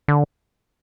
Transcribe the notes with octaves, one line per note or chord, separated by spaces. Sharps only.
D3